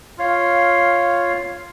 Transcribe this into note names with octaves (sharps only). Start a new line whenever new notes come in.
F4 C#5 F5